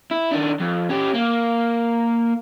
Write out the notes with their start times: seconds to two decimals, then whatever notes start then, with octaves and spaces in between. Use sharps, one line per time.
0.11 E4
0.32 D#3 D4
0.60 F2
0.90 C#4 G4
1.15 A#3